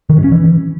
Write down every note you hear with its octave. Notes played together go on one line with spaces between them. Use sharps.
D#3
G2
C#4
E3